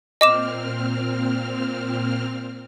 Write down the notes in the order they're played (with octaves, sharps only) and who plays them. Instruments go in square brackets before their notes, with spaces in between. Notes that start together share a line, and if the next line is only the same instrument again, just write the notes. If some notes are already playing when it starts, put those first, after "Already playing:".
[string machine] A#2 C4 F6 [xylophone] D#5 D6 E7